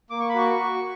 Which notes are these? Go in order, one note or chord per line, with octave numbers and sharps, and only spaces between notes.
A#3 D6
C#6
B5
F#4 C#6
F#4